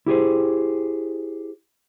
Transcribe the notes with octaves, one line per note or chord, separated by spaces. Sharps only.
E4 G4 G#4 C5